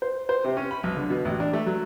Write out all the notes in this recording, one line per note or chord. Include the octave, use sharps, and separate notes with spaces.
C5
C5
C3
C#4
B5
B1
D3
B2
A1
D4
A3
F#3